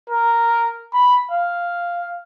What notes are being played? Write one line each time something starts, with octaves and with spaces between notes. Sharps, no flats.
A#4
B5
F5